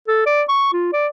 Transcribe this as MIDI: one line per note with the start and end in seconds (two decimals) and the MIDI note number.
0.08 0.21 69
0.26 0.43 74
0.49 0.70 85
0.73 0.90 65
0.93 1.07 74